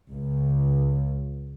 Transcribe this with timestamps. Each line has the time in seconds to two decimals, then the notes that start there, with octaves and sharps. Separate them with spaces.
0.12 C#2